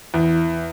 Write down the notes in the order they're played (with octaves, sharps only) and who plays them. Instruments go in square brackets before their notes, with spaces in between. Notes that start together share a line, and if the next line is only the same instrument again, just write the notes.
[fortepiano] E2